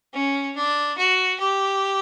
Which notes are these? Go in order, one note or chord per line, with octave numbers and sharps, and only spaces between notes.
C#4
D4
F#4
G4